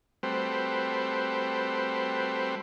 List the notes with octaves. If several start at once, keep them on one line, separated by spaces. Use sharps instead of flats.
G3 A3 C4 F#4 B4 C5